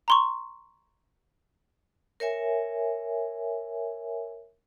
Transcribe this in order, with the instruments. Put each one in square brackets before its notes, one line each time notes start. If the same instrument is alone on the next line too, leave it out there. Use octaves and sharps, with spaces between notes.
[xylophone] A#5 C6 C#6
[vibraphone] A#4 C#5 E5 G#5